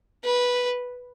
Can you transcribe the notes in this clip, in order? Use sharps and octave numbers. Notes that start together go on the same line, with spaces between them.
B4